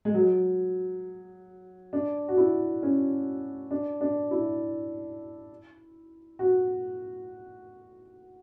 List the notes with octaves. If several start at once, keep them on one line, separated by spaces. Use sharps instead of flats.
G#3
F#3
D4
F#4
E4
C#4
D4
D4
E4
F#4